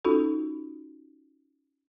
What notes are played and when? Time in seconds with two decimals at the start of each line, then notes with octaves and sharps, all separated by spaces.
0.05 C#4 D#4 F4 F#4 A4